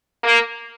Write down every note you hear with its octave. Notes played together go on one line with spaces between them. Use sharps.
A#3